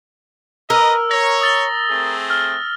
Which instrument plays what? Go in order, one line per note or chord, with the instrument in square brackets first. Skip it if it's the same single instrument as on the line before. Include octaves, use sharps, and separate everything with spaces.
[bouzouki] A#4 [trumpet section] B4 D#5 [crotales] E6
[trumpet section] C#5 [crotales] A#6
[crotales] D#6 A6 G7
[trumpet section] A3 C4 G#4
[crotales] F6 G7